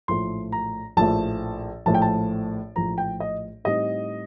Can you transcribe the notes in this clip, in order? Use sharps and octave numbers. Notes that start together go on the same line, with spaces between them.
A#1 A2 F3 A3 C6
A#5
A#1 A2 F3 A3 A5
A#1 A2 F3 A3 A5
G5
A5
A#1 A2 F3 A3 A#5
G5
D#5
A2 G3 C4 D#4 D#5